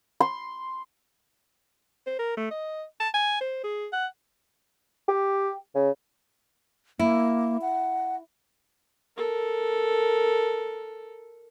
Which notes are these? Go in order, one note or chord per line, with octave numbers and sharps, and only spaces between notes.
C6
C5
A#4
A3
D#5
A5
G#5
C5
G#4
F#5
G4
C#3
A#3 E4
F#5
A4 A#4